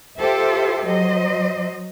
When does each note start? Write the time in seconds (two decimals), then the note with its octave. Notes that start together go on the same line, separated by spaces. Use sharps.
0.19 F4 G4 A4 C5 E5
0.86 F#3 C5 D#5